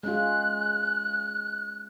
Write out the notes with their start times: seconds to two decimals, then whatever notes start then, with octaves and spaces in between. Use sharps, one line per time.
0.03 G#3 C#4 F4 F#6